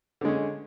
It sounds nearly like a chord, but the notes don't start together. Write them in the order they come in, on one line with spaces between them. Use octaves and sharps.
D3 G#3 C#4